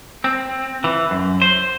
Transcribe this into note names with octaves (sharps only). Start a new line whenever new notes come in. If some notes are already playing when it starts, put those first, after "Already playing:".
C4
E3
F#2
C5